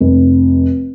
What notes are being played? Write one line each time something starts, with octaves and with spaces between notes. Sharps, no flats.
F1